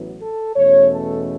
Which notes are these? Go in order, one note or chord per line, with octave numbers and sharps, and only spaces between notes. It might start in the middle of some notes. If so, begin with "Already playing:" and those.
Already playing: A1 A2 F#3 B3
A4
E2 B2 A3 C#4 C#5
A4